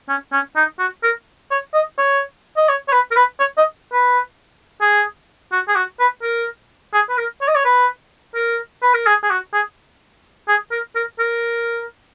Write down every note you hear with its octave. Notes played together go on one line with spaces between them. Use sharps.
C#4
C#4
D#4
F#4
A#4
C#5
D#5
C#5
D#5
C#5
C#5
B4
A#4
B4
C#5
D#5
B4
G#4
F#4
G#4
F#4
B4
A#4
G#4
B4
A#4
C#5
D#5
C#5
B4
A#4
B4
A#4
G#4
G#4
F#4
G#4
G#4
A#4
A#4
A#4